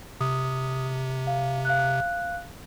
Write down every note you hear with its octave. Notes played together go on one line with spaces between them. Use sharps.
C3 D#6
F5
F5 F#6